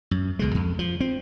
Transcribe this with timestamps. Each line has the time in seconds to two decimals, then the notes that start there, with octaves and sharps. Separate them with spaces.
0.11 F#2
0.39 C#2 B2 G#3
0.55 F2
0.79 F3
1.00 C4